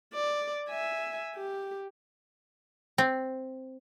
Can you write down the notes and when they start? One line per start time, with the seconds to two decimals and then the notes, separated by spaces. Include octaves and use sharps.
0.14 D5
0.69 E5 G#5
1.36 G4
2.98 C4